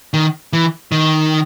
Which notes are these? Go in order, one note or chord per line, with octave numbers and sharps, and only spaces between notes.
D#3
E3
D#3